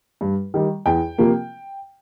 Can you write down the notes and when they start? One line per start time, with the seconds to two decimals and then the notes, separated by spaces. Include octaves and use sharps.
0.21 G2
0.54 D#3 G3
0.86 E2 G5
1.18 C3 F3 A#3